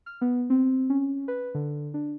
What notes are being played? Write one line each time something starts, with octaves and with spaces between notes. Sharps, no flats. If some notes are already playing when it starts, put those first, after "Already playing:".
F6
B3
C4
C#4
B4
D3
D4